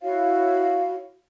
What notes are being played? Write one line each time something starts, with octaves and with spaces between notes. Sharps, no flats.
E4 F#4 C#5 F5